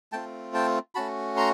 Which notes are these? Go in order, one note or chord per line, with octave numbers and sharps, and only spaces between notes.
A3 C4 F4 G5 A5
G5 A5
A3 C#4 F#4 A5 B5
A#5 C6